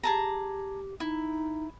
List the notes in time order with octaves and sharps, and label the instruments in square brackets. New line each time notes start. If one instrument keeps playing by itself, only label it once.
[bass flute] G4 [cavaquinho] G#4 A5 A#5
[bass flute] D#4 [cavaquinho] E4